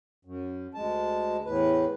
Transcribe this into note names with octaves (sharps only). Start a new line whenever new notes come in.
F#2
D2 G#3 A5
E2 A2 B4